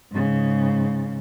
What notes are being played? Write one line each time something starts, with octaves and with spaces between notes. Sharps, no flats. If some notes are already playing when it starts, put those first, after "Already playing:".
G#2 C#3